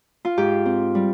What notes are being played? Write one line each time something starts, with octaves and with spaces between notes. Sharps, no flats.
F4
G#2 G4
C4
G3